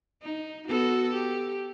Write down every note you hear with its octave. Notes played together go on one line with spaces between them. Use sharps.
D#4
B3 F#4 A4
G4